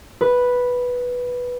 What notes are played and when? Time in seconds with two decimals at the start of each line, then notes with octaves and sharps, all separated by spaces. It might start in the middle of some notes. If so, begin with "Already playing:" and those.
0.21 B4